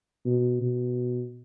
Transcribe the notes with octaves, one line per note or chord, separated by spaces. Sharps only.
B2
B2